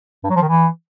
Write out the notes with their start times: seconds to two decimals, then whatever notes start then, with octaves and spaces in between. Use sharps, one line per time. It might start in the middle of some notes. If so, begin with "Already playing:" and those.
0.24 G2
0.30 F#3
0.36 F3
0.42 D#3
0.48 E3